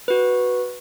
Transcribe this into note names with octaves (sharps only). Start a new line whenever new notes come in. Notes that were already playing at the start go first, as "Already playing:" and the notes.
F#4 B4